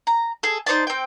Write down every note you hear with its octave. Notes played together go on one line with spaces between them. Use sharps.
A#5
G#4 A4
D#4 C5 D5 A5
C4 G5